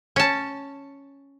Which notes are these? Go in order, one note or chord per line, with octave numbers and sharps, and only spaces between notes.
C#4 A5